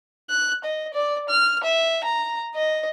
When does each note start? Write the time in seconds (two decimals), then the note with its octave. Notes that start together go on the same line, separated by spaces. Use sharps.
0.30 F#6
0.64 D#5
0.94 D5
1.29 F6
1.63 E5
2.04 A#5
2.55 D#5